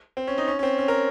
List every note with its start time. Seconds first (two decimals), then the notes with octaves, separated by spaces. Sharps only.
0.17 C4
0.27 C#4
0.38 D#4
0.47 C#4
0.59 C#4
0.63 C4
0.78 C#4
0.88 A#4